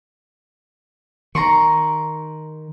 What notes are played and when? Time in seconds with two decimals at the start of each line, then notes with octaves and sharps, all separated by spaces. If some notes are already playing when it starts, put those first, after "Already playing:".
1.35 D#3 A#5 C6 C#6